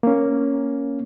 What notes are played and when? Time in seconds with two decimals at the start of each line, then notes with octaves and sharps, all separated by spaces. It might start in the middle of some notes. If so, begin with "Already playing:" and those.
0.03 A#3 C#4